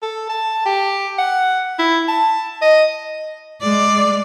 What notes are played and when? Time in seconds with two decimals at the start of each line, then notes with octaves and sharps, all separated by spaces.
0.03 A4
0.29 A5
0.66 G4
1.18 F#5
1.79 E4
2.08 A5
2.62 D#5
3.62 G#3 D5